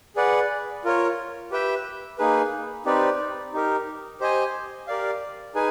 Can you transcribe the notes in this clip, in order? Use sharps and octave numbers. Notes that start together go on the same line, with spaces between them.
G#4 B4 D5 F#5
F4 A#4 C#5
G4 B4 E5 G5
A#3 D#4 G#4 B4
C4 D#4 G4 B4 D5
D#4 G4 A#4
G4 C5 D#5 G#5
G4 A#4 D5 F5
D#4 G#4 B4 G#5